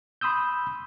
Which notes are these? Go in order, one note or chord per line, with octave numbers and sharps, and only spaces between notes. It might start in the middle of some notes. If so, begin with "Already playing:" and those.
B5 C6 D#6 E6 G6